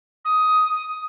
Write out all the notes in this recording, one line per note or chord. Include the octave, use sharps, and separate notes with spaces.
D#6